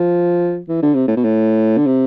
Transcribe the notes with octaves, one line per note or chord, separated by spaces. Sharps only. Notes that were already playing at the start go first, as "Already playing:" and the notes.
Already playing: F3
E3
D3
C3
A2
B2
A2
D3
C3